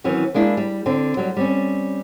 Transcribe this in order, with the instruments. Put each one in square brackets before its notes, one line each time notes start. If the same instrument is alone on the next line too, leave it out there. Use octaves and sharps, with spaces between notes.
[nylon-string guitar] D#3 E3 F#3 C4 C#4
G#3 A#3 D4 E4
G3
D3 C4
F#3 G3
G3 C4 C#4